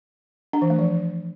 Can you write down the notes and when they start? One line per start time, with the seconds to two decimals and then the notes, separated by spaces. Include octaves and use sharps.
0.53 D4
0.62 E3
0.70 A3
0.79 F3